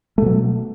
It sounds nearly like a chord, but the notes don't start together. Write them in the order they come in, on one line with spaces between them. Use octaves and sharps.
A3 B2 F#3